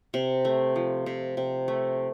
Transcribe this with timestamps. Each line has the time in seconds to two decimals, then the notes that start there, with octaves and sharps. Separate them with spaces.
0.14 C3
0.45 A3
0.76 F3
1.06 C3
1.37 C3
1.68 A3